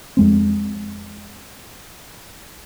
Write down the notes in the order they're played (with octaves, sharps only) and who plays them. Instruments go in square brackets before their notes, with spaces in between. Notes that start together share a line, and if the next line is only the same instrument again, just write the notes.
[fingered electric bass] F2 G#3 C4